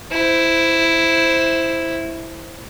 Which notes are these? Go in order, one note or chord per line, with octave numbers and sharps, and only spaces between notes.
E4 C5